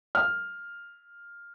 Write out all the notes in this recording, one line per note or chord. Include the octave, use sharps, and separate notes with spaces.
F6